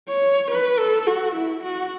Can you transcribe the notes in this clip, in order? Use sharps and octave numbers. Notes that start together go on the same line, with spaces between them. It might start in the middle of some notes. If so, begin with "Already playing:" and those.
C#5
B4
A4
F#4
E4
F#4